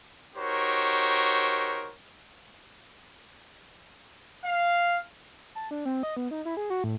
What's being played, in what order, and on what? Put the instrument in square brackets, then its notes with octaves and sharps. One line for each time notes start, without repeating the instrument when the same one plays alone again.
[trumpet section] D#4 F#4 G4 A#4 C5 C#5
F5
[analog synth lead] A5
D4
C4
D#5
B3
D#4
E4
G#4
F#4
A2